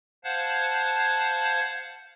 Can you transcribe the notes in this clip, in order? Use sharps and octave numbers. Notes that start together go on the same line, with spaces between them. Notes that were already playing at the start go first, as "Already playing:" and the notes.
C5 F5 F#5 A5 F#6 G#6